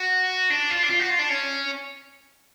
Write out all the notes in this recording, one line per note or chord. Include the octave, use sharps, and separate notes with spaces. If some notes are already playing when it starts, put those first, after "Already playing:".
Already playing: F#4
D4
F4
D4
F4
F#4
F4
D4
C#4